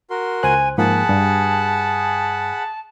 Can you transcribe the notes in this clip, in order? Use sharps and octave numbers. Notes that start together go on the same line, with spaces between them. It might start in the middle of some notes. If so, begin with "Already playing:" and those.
F#4 A#4 C6
C#2 C5 G#5 F#6
G#2 F3 A#3 G#4 F#5 A5 B5
G2